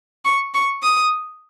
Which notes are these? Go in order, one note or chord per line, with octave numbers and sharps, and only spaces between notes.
C#6
C#6
D#6